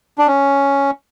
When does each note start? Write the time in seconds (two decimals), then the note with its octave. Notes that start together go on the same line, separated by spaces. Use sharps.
0.18 D4
0.27 C#4